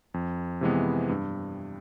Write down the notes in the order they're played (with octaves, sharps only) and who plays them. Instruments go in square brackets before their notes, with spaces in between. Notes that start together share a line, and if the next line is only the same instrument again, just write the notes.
[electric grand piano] F2
C3 E3 G#3 B3
G2